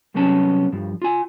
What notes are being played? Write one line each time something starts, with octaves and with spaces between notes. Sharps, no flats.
C2 F#3 A3 B3 C#4 A5
G2 F3
F4 G#5